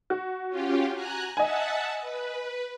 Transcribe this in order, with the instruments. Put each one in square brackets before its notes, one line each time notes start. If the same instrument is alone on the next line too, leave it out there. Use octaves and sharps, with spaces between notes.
[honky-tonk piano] F#4
[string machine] C#4 F4 G4
G#5 A#5 F#6
[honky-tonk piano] D#5 G#5 [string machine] E5 F#5 A5
[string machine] B4